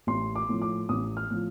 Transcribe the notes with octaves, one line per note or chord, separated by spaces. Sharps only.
A1 C6
D6
A2 F3
D6
A1 D#6
F6
A2 F3